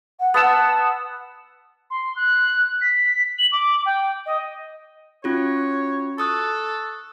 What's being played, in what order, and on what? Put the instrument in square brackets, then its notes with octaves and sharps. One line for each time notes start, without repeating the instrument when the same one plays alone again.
[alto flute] F#5
[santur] B3 F#5 E6 [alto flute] A5
[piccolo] C6
F#6
B6
F#7
D6
G5
D#5
[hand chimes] C#4 F4 F#4 [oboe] C#5
[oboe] A4 [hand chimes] C#6 D#6 F#6